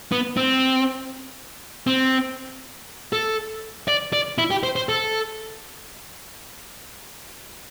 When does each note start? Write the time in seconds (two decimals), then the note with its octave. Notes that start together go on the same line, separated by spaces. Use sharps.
0.12 B3
0.37 C4
1.87 C4
3.13 A4
3.88 D5
4.13 D5
4.38 E4
4.51 G4
4.63 C5
4.76 C5
4.89 A4